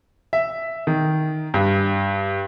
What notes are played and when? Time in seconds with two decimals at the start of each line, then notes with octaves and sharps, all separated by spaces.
0.33 E5
0.87 D#3
1.54 G2